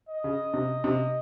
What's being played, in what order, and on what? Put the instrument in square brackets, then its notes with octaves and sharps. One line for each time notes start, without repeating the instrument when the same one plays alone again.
[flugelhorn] D#5
[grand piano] C#3
C3
C3